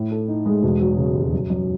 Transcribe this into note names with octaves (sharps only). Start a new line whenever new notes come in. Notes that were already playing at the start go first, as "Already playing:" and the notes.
Already playing: A2
A4
D#4
G#3
E1
F#3
C#3
D#2
F#2
F#2